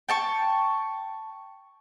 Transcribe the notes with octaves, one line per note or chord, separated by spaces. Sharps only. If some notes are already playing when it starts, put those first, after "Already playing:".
G5 A5 C#6